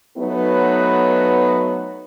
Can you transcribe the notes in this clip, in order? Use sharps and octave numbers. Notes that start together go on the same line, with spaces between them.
F#3 A3 B3 D#4 B4